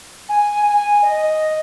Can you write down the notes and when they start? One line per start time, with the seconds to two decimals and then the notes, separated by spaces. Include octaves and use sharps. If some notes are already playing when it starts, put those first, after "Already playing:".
0.29 G#5
0.66 G#5
1.03 D#5